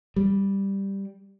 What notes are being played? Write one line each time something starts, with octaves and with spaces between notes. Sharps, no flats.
G3